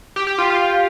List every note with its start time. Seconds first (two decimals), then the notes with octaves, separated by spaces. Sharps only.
0.16 G4
0.27 G4
0.38 F4
0.50 F4